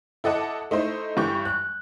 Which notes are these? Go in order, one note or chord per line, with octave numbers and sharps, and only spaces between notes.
E4 A4 D#5 F#5 A5 D6
A3 D#4 E4 C5
G2 E3 G4 C#6 G6
F#6